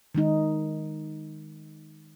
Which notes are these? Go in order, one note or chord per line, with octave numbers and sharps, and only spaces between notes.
D#3 G#3 D#4